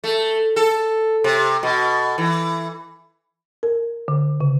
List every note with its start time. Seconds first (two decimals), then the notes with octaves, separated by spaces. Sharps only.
0.04 A3
0.56 A4
1.24 C3
1.63 B2
2.18 E3
3.63 A#4
4.08 D3
4.41 C#3